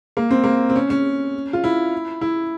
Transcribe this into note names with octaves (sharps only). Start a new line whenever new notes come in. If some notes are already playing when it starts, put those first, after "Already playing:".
A#3
C4
A#3
C4
C#4
C#4
F4
E4
E4